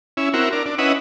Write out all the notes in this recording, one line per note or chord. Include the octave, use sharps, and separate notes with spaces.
C#4 E4
C4 E4 F#4 A#4
D4 A#4
D4
C#4 E4 B4 D#5 F#5